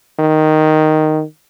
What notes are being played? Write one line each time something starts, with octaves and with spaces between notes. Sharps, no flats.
D#3